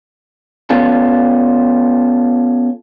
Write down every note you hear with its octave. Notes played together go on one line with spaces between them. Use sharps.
B3 C#4 F4 A4